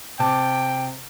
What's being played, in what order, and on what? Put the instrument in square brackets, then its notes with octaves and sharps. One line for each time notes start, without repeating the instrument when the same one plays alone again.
[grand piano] C3 A5 D6 [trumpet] G5